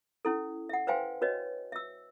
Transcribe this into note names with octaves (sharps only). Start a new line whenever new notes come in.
C#4 E4 A4
E5 F#5
B4 C5 F5 G5 G#5 C6
F#4 B4 C#5 D#5
E5 E6